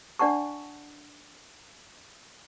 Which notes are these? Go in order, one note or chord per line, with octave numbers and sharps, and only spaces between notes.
D4 D5 F#5 A5 C#6